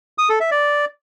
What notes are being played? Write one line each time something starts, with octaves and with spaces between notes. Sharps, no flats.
D#6
A4
E5
D5